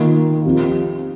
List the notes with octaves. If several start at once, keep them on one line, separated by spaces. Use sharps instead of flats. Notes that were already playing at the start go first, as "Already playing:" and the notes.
Already playing: D#3 A#3 F4
F3 C4 G4